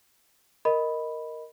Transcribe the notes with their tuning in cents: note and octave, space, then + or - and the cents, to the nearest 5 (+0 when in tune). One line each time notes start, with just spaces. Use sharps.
A#4 +0 D#5 +0 B5 +0